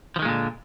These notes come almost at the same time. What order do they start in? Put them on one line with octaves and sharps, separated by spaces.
F3 D#3 G#3 A#2 D3